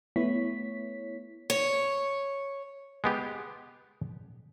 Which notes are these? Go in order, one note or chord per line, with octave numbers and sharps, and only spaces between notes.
A3 B3 E4 C#5 B6
C#5
G#3 B3 G4